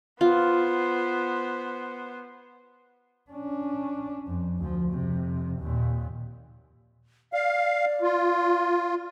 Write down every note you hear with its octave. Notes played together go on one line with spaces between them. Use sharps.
B3 F4 C5
C#4 D4
F2
D2 F3
F2 C3
D#2 A#2
D5 F5
F4